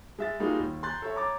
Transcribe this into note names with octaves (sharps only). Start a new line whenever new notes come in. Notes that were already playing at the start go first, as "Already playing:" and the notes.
G#3 E5 A6
G3 G#3 A#3 D#4 F4 F#4
D#2
A#5 C6 F#6 G6 A6
A4 C#5 E5
C#5 A#5 D6 A6